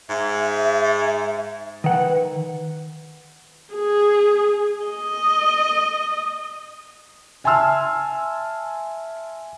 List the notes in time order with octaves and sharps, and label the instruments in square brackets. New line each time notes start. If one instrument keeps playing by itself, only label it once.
[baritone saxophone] G#2 [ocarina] E5
[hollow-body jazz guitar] D#3 F#5 [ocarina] B4
[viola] G#4
D#5
[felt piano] E5 G#5 A5 C6 E6 F6